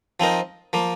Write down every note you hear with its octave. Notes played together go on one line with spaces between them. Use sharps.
F3 C4 D#4 A#4
F3 A#3